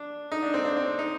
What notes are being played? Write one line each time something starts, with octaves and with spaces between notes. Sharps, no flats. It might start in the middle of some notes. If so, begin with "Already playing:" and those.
Already playing: D4
D#4
D4
C4
D4
C4
D#4